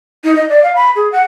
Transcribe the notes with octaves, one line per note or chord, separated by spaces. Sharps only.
D#4
D#5
D5
F5
B5
G#4
F#5